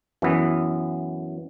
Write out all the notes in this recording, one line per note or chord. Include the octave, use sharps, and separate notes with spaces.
F#2 E3 B3